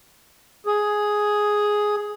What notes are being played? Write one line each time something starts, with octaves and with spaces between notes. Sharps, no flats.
G#4